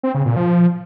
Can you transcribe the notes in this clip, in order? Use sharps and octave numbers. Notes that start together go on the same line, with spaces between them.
C4
C#3
A#2
F3